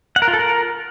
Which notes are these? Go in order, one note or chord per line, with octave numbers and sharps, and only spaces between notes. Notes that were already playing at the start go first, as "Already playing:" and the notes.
F#5
A#4
F4
A4
A#4